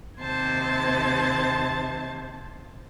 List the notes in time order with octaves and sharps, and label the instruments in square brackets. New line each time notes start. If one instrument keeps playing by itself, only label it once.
[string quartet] D#2 C3 C5 A5 G#6